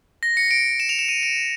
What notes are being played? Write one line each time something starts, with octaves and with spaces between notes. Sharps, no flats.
A#6
C#7
D7
E7
F7
E7
D#7
D7